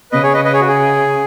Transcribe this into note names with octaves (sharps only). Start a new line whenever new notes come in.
C#3 B4 D#5
G#4 C#5
B4 D#5
B4 D#5
G#4 C#5
F#4
G#4